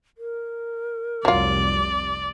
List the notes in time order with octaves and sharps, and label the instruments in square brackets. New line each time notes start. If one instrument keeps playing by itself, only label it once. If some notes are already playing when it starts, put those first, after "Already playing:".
[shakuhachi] A#4
[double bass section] F1 C2 [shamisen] F#3 F4 [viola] D5